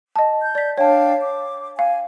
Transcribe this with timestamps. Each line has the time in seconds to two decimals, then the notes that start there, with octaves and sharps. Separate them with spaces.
0.16 D#5 A5
0.41 G6
0.55 D5 B6
0.78 D4 C#5 F5 G5 A5
1.22 D6
1.79 F5 G#5